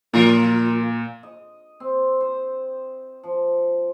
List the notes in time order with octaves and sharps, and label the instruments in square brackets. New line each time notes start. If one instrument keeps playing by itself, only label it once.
[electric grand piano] A#2 [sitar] F3 F4 A#4
[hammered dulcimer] D#5
C4
C5
F3